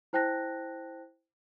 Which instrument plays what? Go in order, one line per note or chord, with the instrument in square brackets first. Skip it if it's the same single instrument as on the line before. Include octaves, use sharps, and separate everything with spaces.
[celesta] E4 C5 G5 A5 F#6 A#6